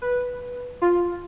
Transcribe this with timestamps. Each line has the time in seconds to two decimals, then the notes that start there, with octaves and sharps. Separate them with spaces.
0.02 B4
0.82 F4